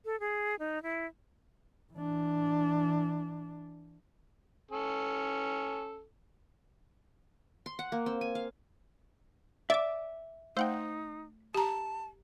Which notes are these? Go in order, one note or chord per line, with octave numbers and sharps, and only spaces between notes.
A4
G#4
D#4
E4
E3 D4
C#4 A4
C6
F#5
A#3
C4
G#5
F5
D5 E5 D6
A3 D#4 C5 F#5 G5
G4 A5 A#5